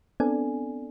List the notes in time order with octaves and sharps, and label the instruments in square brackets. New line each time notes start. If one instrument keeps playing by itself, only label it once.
[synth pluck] B3 C4 D4 A4 D5 G#5